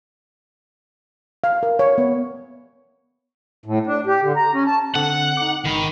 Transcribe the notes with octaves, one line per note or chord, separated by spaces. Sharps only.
F5
A#4
C#5
B3
A2
D4
G4
D3
A#5
C#4
A5
D3 C4 F#5
D#4 D6
G#1 G#2 D#3 B5